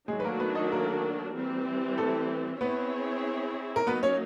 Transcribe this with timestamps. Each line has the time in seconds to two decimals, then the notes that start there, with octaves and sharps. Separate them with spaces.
0.08 D#3 F#3 G#3 A3 D4 F#4 G#4
0.20 B4
0.24 A#3 A#4
0.40 B3 B4
0.55 D#4 D#5
0.72 A#3 A#4
1.34 E3 G3 C4
1.98 A3 A4
2.61 B3 C4 E4 G#4 B4 C#5
3.76 A#4
3.87 F#3 A#3 B3 D#4 B4
4.03 C#4 C#5